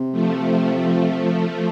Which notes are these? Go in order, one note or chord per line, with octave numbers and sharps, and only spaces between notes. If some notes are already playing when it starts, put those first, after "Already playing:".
Already playing: C3
F3 A3
F3